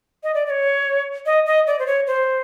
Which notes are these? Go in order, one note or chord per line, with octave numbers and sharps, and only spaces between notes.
D#5
D5
D5
C#5
D#5
D#5
D5
C5
C#5
C5